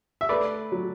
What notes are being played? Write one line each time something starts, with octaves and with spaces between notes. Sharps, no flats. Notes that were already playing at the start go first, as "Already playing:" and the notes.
E5
A3 B4 D5
F#3